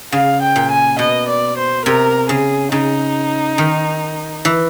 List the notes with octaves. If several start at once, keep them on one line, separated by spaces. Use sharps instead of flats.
C#3 F5
G5
A#2
G#5
B2 D#5
D5
C5
C3 A#4
C#3 G#4
C#3 D#4
D#3
E3